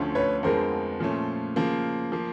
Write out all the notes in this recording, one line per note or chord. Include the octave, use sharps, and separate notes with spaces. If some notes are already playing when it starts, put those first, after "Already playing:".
Already playing: D2 D3 F3 A3 C#4
B4 C#5
F2 D3 F3 G#3 B3 A#4 C5
A#2 F3 A3 C#4
C#3 F3 A#3
F3 A#3